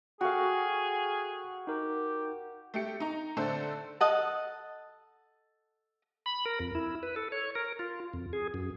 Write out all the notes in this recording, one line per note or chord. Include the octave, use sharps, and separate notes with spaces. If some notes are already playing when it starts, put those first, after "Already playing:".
F#4 G#4 A4 F5 G5
D#4 G4 A#4
A3 G4 C#7
D#4 A#5
D3 A3 C4 D4 A4 C5
A4 D#5 F#5 A5
B5
A#4
F2
E4
B4
A4
C#5
A#4
F4
F2
G#4
F#2